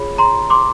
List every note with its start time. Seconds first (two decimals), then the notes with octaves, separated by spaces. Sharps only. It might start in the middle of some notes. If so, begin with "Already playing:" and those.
Already playing: F4 G#4 C#5 B5
0.18 A#5 C6
0.50 C6 D6